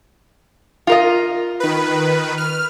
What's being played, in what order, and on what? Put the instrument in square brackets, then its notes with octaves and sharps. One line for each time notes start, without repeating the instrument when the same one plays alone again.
[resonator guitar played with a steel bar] F4 A#4 D#5
[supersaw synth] D#3 B4
F6